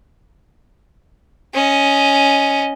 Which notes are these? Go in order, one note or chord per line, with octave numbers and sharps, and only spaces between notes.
C#4 D#5